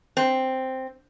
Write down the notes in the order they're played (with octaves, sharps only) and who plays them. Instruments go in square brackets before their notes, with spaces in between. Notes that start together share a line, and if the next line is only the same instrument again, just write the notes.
[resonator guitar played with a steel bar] C4